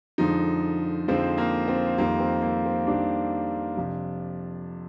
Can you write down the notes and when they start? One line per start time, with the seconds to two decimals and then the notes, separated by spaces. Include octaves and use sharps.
0.18 F2 D3 F3 G#3 D#4
1.08 F2 D3 F3 G#3 C4
1.38 A#3
1.68 C4
1.97 F2 D#3 G3 A#3
2.19 C4
2.42 A#3
2.66 C4
2.87 F2 D#3 G3 D4
3.77 F2 C3 F3